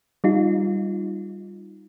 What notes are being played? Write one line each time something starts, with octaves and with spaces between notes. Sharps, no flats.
G3 D#4 F4